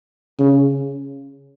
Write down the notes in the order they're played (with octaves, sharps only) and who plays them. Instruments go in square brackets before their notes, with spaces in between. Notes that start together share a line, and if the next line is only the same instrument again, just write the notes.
[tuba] C#3